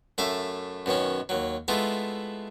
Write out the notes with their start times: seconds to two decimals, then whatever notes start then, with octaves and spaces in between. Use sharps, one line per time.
0.18 F#2 A3 E5 F5
0.86 F#2 B2 D#3 C#4
1.29 D#2 F#3
1.68 G#3 A3 B3 E4 F4